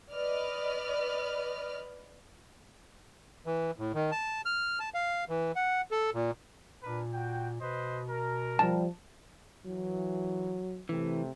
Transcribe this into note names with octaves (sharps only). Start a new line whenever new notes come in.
B4 D5 D#5 F6
E3
A2
D#3
A5
F6
A5
F5
E3
F#5
A4
A#2
A#2 D4 A#4 B4
F#4 G5
B2 B4 C5 D#5
A#4
F3 G3 A5
E3 F#3
C3 E3 A3